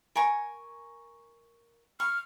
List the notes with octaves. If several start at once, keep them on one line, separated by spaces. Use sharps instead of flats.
A#4 G#5 C#6
C#6 F6